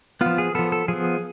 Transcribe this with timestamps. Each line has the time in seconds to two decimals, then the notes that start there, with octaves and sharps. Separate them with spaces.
0.21 F3 B3 F4
0.38 G#4
0.55 F3 B3 A4
0.72 A4
0.88 F3 B3 G#4